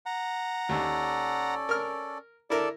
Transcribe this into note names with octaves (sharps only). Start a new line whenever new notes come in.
F#5 A#5
D#2 C#4 A4 D5
A#4 F6
E4 A4 A#4 D5